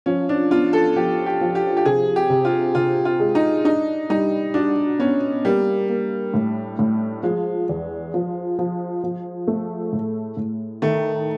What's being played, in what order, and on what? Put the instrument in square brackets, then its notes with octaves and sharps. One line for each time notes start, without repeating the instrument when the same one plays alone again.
[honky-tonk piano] F3 [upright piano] C#4
[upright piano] D4
[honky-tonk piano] B3 [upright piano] F4
[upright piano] A4
[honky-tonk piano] F3 [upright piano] G4
[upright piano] G4
[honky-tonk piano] F3
[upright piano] G4
G4
[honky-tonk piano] C3 [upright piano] G#4
[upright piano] G4
[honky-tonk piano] C3
[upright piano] F4
[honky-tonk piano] C3 [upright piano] F4
[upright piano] F4
[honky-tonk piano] G#3
[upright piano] D#4
[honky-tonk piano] D4 [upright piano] D#4
[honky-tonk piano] G3 [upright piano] D#4
[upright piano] D4 [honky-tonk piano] F#4
[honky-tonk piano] B3 [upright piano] C#4
[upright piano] G3 [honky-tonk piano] A#3
[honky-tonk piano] A#3
A2
A2
[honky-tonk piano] F3 [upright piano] G#3
[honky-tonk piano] E2
F3
F3
F3
A3
A2
A2
[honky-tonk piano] D#3 [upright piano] A3